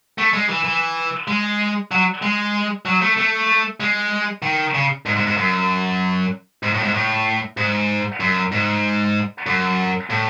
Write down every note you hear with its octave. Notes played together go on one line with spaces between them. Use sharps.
A3
G#3
E3
E3
G#3
F#3
G#3
F#3
A3
A3
G#3
D#3
C#3
G#2
G#2
G#2
F#2
G#2
A2
G#2
A2
G#2
F#2
G#2
F#2
A2